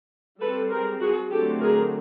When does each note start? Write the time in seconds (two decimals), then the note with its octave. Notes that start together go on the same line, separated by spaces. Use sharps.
0.40 G3 C4 A4 B4
0.71 G#4 A#4
1.01 F#4 G#4
1.31 D3 F#3 A3 C4 G4 A4
1.61 G#4 A#4